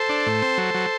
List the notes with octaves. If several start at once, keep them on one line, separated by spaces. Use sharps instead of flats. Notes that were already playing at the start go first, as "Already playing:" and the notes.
Already playing: A4 C5
D4
A2
C4
F#3
F#3